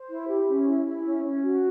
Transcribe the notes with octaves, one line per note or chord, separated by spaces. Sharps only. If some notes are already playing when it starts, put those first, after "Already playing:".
Already playing: C5
E4
G4
C#4
E4
E4
C#4
C#4
F#4